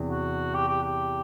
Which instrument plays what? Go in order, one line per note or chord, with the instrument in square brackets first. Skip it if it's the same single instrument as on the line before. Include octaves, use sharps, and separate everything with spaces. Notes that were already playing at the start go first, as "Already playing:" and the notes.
Already playing: [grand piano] E2 C3 E3
[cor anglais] F#4
G4
G4
G4